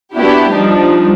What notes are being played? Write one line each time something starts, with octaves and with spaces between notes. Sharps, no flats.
B3 D4 E4 F#4 G4
F3 G3 D4 D#4